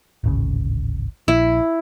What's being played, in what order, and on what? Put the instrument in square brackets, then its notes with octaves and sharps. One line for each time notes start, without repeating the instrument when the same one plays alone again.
[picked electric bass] D1 G#1 C#3
[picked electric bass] A#1 [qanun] E4